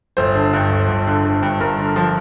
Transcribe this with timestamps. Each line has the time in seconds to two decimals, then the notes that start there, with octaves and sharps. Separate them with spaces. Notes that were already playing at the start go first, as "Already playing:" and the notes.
0.17 G1 C5
0.35 D3
0.53 G2
0.71 G1
0.88 G1
1.07 D3
1.25 D3
1.43 G2
1.60 G2 A#4
1.78 D3
1.96 F3